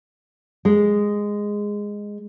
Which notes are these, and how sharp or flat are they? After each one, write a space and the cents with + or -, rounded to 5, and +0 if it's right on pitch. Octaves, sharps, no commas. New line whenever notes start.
G#3 -10